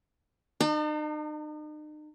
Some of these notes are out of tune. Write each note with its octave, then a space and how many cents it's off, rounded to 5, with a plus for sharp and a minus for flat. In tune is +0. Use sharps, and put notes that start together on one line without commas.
D#4 -40 A5 +35